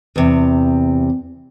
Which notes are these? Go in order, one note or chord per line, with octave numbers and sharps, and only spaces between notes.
E2 C3